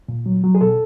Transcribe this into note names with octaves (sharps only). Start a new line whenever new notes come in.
A#2
F#3
F#3
G#4
B2 A4